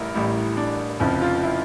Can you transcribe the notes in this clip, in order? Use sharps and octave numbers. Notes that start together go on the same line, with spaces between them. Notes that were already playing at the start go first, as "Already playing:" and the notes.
Already playing: A1 A2 G3 E4 A#4
A1 A2 G3 E4
D4
F1 F2 C#3 F3 E4
F4
E4